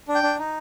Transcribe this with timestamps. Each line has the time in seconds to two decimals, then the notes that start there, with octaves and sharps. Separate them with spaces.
0.08 D4
0.15 G5
0.23 D4
0.38 D#4